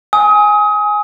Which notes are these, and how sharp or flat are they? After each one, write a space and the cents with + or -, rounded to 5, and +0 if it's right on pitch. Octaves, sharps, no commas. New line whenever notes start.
G#5 +0 D#6 +30